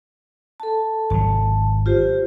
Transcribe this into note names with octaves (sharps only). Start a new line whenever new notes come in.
A4 A5
G#1 F#3 A5
F4 G4 C5